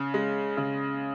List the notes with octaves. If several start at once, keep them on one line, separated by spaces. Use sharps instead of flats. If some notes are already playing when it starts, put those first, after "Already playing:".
Already playing: C#3
G#3
C#3